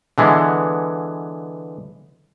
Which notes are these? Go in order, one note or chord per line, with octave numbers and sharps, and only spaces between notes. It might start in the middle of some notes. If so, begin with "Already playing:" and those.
D3 E3 G#3 B3